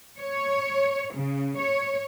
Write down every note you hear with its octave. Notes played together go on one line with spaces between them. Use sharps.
C#5
C#3
C#5